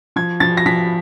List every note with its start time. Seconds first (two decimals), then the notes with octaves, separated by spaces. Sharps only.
0.16 F3 G#6
0.40 F3 A6
0.57 A#6
0.66 F3 B6